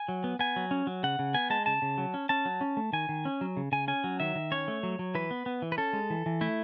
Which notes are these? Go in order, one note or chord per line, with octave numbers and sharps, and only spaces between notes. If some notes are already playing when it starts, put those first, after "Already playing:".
Already playing: G#5
F#3
B3
B3 G#5
F#3
C#4
F#3
C#3 F#5
C#3
B3 G#5
G#3 A5
C#3 A5
C#3
F#3
C#4
C#4 A5
F#3
C#4
A3
D#3 G#5
D#3
C#4
F#3
C#3
C#3 G#5
C#4 G#5
F#3
D#3 E5
D#3
C#4 C#5
A3
F#3
F#3
E3 B4
B3
B3
E3
B4
C#4 A4
G#3
E3
E3
A3 E4